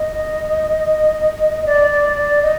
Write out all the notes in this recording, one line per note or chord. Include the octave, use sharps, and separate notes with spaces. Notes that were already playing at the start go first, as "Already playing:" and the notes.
Already playing: D#5
D5
D5
D5
D#5